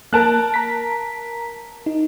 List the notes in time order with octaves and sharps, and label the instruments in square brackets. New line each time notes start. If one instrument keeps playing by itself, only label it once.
[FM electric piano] A#3 [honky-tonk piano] A#4 A5 F#6
[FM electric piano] A#5 B6
D#4